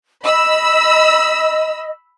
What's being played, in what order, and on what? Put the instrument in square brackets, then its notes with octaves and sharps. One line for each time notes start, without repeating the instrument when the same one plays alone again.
[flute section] D#5 [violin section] B5 E6